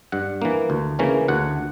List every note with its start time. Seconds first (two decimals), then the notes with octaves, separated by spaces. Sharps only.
0.12 G2 F#5
0.42 E3 A#3
0.70 D2
0.99 C#3 E3 A#3 C#4
1.28 D2 F#5